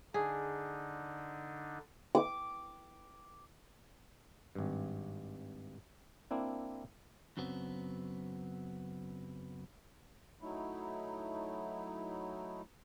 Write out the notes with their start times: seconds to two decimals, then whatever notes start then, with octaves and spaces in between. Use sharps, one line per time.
0.14 D3 D4 D#4 G#4
2.15 D6
4.55 G#1 G2
6.31 A#3 C4 D4 E4
7.37 F#2 C#3 F#3 B3 C4
10.41 F#3 A3 D#4 E4